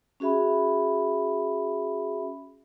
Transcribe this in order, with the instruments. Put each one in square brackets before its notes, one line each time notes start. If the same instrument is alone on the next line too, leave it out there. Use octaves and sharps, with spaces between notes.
[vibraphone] C#4 F#4 G#4 E5 B5